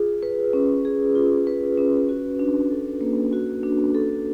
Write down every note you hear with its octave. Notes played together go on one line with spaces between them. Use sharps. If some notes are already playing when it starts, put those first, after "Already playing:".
Already playing: F4 G#4
B4
C#4
G#4
F4
B4
C#4
F#4
D4
A4
A#3
F#4
D4
A4